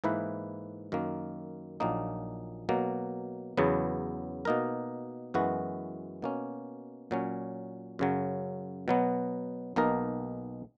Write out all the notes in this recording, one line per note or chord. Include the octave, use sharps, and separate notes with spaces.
G#2 E3 A#3 E4 B4
F#2 D#3 A#3
A#1 A#2 F#3 A#3 D#4
B2 F#3 A#3
E2 C#3 F#3 B3
B2 A#3 D#4 A#4
F#2 E3 G#3 B3 F#4
B2 A#3 C#4
A#2 F#3 C#4
F#2 C#3 F#3
B2 F#3 B3
B1 B2 A#3 D#4 A#4